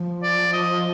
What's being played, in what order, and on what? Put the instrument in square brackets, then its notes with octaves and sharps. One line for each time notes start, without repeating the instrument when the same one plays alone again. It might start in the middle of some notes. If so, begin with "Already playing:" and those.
Already playing: [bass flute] F3
[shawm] D5
D#5